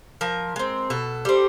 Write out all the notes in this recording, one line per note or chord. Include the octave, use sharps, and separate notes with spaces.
F3 A#4
G#3 C4
B2 A4
G3 C4